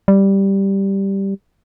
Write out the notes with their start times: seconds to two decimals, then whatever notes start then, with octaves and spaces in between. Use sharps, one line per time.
0.08 G3